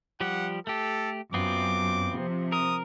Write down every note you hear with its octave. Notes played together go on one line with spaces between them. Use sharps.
F3 G3 G4 F#5
A3 G4 A4
F#2 B3 C4 F4 D6
C3 F3
A#4 D#6